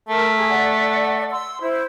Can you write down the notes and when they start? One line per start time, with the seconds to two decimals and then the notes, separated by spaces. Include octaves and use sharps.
0.08 A3 A#4 A5
0.36 G#4 A#5
0.49 D5 F#5
1.30 C6 E6
1.60 E4 C5